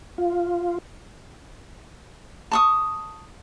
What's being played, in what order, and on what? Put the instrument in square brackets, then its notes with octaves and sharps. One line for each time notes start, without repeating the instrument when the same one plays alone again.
[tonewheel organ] F4
[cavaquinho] A5 C#6 D#6